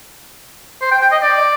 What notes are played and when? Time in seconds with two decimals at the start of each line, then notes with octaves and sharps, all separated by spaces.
0.81 C5
0.91 G5
1.02 G5
1.12 D#5
1.22 D5